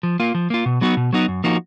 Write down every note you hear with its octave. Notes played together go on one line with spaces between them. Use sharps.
F3
A#3 F4
F3
A#3 F4
B2
F#3 B3 D#4 F#4
B2
F#3 B3 D#4 F#4
F#2
F3 A#3 D#4 F#4